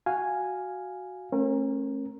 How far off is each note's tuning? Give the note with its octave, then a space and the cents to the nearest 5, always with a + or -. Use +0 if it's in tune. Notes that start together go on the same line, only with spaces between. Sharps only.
F#4 +0 F5 +0 G#5 +0
A3 +0 C#4 -40 A#4 +0